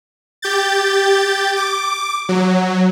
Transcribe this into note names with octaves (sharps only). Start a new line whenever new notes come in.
G4 G6 A6
D6
F#3